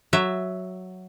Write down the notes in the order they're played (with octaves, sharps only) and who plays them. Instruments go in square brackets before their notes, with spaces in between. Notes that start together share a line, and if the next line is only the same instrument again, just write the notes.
[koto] F#3 E5